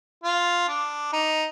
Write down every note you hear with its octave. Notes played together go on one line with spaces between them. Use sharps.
F4
D4
D#4